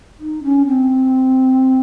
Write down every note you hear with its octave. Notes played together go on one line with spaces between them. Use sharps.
D#4
C#4
C4